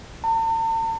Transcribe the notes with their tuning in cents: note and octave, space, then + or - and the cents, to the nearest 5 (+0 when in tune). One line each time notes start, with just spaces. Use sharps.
A5 +45